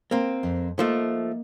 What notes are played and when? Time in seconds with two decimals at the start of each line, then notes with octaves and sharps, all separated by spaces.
0.11 A#3 C4
0.43 F2
0.79 F3 A3 A#3 D#4